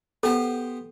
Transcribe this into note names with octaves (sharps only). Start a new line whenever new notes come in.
B3 G4 A4 C5